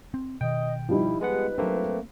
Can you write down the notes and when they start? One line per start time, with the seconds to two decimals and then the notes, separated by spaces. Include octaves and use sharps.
0.14 C4
0.41 B2 D#3 D#5 G5
0.89 F3 G3 D#4 E4
1.21 G#3 B3 B4 F#5
1.58 F#3 A3 A#3 C4 D4